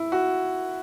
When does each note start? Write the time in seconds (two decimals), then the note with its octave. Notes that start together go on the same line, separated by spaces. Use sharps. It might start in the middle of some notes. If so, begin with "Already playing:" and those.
Already playing: E4
0.12 F#4